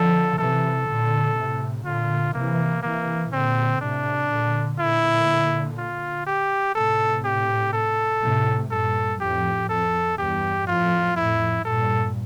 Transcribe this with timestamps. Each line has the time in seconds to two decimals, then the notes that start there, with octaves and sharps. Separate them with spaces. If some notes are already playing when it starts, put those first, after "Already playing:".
Already playing: D3 F3 A4
0.38 C3 E3 A4
0.87 A#2 D3
1.36 A2 C3
1.85 A#2 D3 F4
2.34 C3 E3 A#3
2.83 C3 E3 A#3
3.32 A#2 D3 C4
3.81 A2 C3 D4
4.30 A#2 D3
4.79 A#2 D3 E4
5.78 F4
6.26 G4
6.75 A2 C3 A4
7.24 G4
7.73 A4
8.22 A2 C3
8.71 G2 A#2 A4
9.20 F2 A2 G4
9.69 F2 A4
10.18 E2 G2 G4
10.67 F2 A2 F4
11.16 F2 A2 E4
11.65 G2 A#2 A4